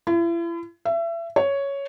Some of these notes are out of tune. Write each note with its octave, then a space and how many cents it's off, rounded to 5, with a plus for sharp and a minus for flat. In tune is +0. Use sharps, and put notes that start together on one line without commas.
E4 +40
E5 +30
C#5 +5